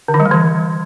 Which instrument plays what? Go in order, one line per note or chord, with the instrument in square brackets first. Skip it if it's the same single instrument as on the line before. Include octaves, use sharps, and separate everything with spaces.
[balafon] D3
D#3
G3
A3
E3